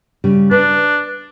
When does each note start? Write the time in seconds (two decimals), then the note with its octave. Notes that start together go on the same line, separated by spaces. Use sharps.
0.24 C#3 G3
0.51 D4 B4